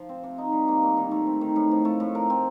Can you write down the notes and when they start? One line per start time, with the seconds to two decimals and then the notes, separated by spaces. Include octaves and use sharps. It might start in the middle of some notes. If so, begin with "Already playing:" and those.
Already playing: F3
0.09 C4
0.23 C3
0.38 D#4
0.52 G3
0.68 A#3
0.83 A#2
0.97 D#3
1.11 A3
1.26 C4
1.41 D#3
1.56 A2
1.71 F3
1.85 A3
2.00 A2
2.15 A#4
2.30 C4